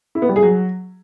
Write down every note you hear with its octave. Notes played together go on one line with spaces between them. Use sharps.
E4
B3
G3
G#4
F#3